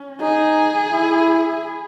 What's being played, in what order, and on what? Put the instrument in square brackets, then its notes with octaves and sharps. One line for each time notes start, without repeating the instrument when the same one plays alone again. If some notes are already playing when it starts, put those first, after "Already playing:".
Already playing: [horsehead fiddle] C#4
[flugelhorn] D#4 [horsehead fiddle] G#4
[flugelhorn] E4